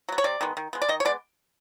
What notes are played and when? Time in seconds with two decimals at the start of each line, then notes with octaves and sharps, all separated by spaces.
0.09 F#3 B3
0.18 C#5
0.24 C3 D5
0.41 D#3 G#3 B3
0.57 D#3
0.73 G#3 B3
0.82 D5
0.89 D#3 D#5
1.00 C#5
1.05 G#3 B3 D5